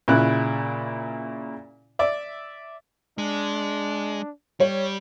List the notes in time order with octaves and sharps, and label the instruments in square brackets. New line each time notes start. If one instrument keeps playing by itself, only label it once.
[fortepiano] A#2 C#3 E4 F#6
D5 E5
[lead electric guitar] G#3 [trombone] D4
[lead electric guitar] G3 [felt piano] C#5